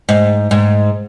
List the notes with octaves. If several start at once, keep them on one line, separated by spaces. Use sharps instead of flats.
G#2
G#2